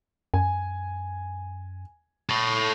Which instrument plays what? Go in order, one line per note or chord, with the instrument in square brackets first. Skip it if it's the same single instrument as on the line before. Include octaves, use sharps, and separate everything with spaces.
[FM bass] F#2 [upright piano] G#5
[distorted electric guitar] A4 C#5